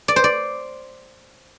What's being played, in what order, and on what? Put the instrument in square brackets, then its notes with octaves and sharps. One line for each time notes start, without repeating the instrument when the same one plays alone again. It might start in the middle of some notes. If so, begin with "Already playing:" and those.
[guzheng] D5
C5
D5